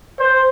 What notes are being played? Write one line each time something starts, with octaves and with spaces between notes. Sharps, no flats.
C5